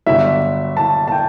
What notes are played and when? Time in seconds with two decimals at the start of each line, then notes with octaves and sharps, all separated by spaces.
0.07 G1 G2 F#3 E5
0.77 A5
1.08 A5
1.12 G5